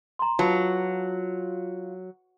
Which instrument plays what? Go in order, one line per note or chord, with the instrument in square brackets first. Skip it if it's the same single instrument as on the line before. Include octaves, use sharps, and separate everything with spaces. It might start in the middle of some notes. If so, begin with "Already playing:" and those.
[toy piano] A#5 C6
[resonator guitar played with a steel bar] F#3 [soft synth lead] F4 [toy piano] B4 A5 B5